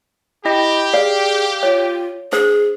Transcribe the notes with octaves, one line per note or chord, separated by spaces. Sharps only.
E4 G4 D#5
G#4 D5 F5
F4 C#5
D4 G#4 C5